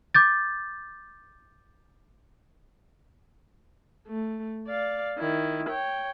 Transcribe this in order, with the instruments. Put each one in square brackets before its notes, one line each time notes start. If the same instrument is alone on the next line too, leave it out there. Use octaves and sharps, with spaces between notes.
[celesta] D6 G6 A6
[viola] A3
D5 F5
D#3 E4
C#5 G5